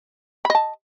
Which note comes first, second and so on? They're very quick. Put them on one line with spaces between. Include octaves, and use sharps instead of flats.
B5 D#5 A5